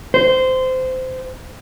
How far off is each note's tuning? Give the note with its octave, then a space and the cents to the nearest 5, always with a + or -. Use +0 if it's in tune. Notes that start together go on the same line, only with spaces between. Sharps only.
C5 -20